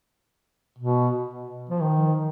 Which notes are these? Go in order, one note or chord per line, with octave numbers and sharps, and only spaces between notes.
B2
F3
D#3